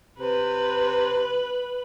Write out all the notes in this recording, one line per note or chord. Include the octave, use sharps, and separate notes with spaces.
C3 B4